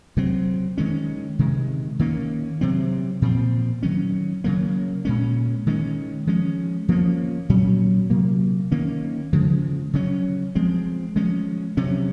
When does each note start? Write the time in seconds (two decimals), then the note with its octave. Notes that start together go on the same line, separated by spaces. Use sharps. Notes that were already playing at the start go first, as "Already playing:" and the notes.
0.17 C3 F#3 C4
0.78 D#3 G#3 C#4
1.39 C3 D#3 G#3
1.99 D#3 A#3 C#4
2.61 C3 F#3 C4
3.22 A#2 F3 C4
3.83 D#3 F#3 C#4
4.44 C#3 F#3 A#3
5.05 A#2 G#3 C#4
5.67 D#3 G#3 C#4
6.27 F3 G#3 C#4
6.88 F3 A#3 C#4
7.49 A#2 F#3 C#4
8.10 C3 F#3 A#3
8.72 D#3 A#3 C#4
9.33 C#3 F3 G#3
9.93 C#3 F#3 C#4
10.55 F3 G#3 C4
11.16 F3 G#3 C#4
11.77 C3 F#3 C#4